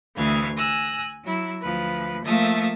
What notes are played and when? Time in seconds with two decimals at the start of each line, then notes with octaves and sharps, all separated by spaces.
0.17 D2 E3 F5 G#6
0.57 G#5 E6 F#6 A#6
1.24 F#3 E4
1.62 D2 F3 B4
2.24 F3 A3 A#3 E5 A5 D#6